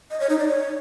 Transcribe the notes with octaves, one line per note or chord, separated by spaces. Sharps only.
D#5
C#5
D#4
D5
C#5